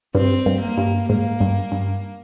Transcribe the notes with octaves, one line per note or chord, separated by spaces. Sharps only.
G2 C4
G2
A#3
G2
G#2 A#3
G2
G2